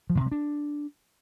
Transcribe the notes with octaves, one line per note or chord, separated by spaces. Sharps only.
F3
A2
C3
G3
D4